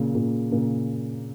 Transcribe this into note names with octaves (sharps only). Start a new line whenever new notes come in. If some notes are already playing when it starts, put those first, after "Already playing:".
Already playing: A#2 C#3
A#2 C#3
A#2 C#3